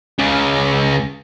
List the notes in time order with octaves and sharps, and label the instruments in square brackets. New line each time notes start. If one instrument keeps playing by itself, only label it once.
[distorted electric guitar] C#2 C#3